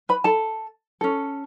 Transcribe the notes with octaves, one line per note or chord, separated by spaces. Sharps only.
B4 B5
A4 A5
C#4 A4